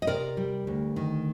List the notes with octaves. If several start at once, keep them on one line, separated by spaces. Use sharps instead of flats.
D#5
C3 A#4 D5
G3
D2
D#3